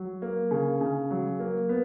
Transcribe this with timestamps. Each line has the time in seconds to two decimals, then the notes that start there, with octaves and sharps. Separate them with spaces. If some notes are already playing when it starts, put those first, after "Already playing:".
Already playing: F#3
0.22 A#3
0.51 C#3
0.81 C#3
1.11 F#3
1.39 A#3
1.69 B3